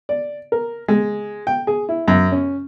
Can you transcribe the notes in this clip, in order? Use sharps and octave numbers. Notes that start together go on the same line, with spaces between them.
D5
A#4
G#3
G5
G#4
E4
F#2
C#4